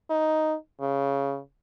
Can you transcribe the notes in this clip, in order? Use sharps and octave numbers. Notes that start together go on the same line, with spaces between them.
D#4
C#3